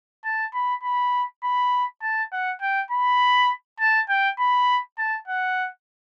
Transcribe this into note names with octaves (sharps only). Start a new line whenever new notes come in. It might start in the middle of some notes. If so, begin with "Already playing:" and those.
A5
B5
B5
B5
A5
F#5
G5
B5
A5
G5
B5
A5
F#5